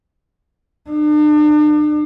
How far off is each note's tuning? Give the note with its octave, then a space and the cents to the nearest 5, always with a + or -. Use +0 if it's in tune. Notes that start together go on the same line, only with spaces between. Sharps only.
D4 +40